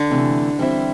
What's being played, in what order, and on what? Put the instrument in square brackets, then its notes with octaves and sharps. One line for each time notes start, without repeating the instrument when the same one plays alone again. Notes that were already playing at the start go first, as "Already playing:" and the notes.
Already playing: [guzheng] D3
[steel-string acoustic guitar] C3 E3 A3
E3 G3 C4 E4